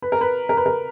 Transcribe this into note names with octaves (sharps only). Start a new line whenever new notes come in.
B4
A#4
B4
A#4
B4
A#4